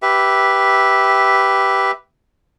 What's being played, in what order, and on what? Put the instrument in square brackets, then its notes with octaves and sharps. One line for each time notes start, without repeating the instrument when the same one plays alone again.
[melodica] G4 B4 E5